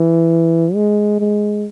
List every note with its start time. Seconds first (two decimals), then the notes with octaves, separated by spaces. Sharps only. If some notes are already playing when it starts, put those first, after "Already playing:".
Already playing: E3
0.75 G#3
1.20 G#3